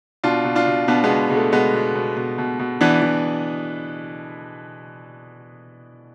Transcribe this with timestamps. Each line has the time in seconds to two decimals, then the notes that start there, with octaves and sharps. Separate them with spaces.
0.24 B2 D4 F4
0.45 B2
0.55 D4 F4
0.67 B2
0.88 B2 B3 D4
1.04 G#3 B3
1.10 B2
1.30 B2 G#3
1.36 A3
1.52 B2 G#3 B3
1.73 B2
1.95 B2
2.17 B2
2.38 B2
2.60 B2
2.81 E3 B3 D4
3.02 E3